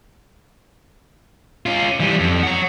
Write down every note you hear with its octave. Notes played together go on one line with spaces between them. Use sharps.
C#4 F4
E3 G3
F2
C#5 F#5